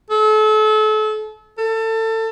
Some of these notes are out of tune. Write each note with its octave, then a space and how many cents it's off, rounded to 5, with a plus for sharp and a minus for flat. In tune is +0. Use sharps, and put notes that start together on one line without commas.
A4 -35
A4 +25